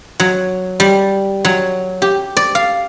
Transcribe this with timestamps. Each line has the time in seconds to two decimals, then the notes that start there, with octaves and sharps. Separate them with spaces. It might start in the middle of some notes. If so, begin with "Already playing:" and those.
0.20 F#3
0.80 G3
1.45 F#3
2.02 G4
2.37 D5
2.55 F5